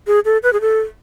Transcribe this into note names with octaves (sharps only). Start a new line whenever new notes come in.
G#4
A4
B4
G#4
A4